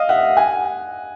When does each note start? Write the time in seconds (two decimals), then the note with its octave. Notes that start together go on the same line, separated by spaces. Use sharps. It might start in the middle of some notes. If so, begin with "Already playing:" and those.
Already playing: D#5 F5
0.09 E5 F#5
0.37 F#5 G#5